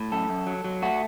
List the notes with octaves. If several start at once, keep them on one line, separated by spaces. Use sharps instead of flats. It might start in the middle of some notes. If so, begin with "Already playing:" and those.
Already playing: A2
F#2 A4
F#2
F#3
F#3
A3 F#4